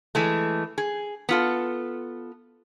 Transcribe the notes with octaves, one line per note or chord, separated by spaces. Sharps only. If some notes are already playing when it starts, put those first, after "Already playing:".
E3 G#3 A3
G#4
B3 F4 A4